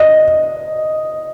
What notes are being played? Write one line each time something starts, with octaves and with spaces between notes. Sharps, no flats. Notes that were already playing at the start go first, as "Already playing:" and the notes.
Already playing: D#5